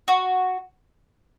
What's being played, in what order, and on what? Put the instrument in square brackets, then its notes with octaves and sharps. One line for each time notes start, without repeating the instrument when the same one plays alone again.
[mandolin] F#4